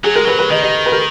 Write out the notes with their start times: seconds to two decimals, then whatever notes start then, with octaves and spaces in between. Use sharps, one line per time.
0.04 F#3 G#4
0.14 G#3 A#4
0.25 F#3 B4
0.39 B4
0.51 D#3 D#5
0.62 D#5
0.86 B4
0.92 A#4